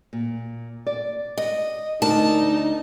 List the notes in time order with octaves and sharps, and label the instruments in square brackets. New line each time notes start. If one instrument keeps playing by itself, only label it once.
[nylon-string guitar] A#2
D5
[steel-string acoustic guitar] D#5
[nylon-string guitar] D2 D4 A#4 [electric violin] D#4 [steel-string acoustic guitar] A5